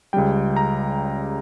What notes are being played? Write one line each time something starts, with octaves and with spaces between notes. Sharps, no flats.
C#2 C#3 G3 G5
A#5